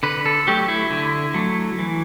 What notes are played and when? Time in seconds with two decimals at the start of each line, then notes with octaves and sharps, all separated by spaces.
0.03 D3 B4
0.26 A4
0.47 F#3 A3 G4
0.68 E4
0.91 D3
1.34 F#3 A3
1.79 E3